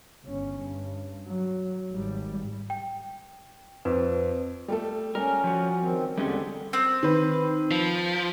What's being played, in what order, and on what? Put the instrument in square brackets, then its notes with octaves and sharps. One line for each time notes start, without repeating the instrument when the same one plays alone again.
[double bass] G1 C#4
G2
F#3
G#1 G3
[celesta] G5
[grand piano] F2 [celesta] B4
[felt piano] G3 A3 A4
[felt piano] G3 [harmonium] C#4 [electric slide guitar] A#4
[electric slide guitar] F3 F#4
[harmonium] D#3 C4
[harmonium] E2 D3 [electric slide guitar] G3 C#4 A4 [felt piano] G#3 C4 G4
[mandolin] C4
[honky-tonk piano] D#3 B4
[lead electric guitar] F3